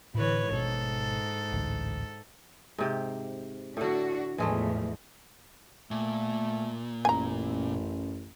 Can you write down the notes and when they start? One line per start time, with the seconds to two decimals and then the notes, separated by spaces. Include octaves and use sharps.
0.15 A2 D3 E3 B4 C#5
0.50 G#1 G#2 B2 A4
1.52 A1 D2
2.78 G#2 C3 G4
3.77 A2 D3 D4 F#4
4.38 E2 A2 E3 F3 G#3 A3
5.91 A#2 A3
7.05 A1 F#2 G#5 A#5